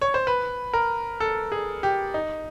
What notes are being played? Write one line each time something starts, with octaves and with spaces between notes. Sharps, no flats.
C#5
C5
B4
A#4
A4
G#4
G4
D#4